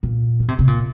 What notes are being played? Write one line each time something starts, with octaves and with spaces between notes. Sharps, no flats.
A#2
D#3
C3
C3
A#2